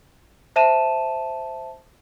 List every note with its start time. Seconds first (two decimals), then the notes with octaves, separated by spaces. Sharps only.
0.56 C5 E5 A5 D#7 E7